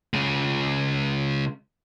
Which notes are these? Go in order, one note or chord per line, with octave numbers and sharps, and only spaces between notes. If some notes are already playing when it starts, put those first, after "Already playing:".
C#3 G#3